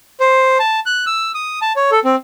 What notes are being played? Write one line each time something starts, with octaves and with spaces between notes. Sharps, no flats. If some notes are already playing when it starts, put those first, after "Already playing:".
C5
A5
F#6
E6
D#6
A5
C#5
A4
C4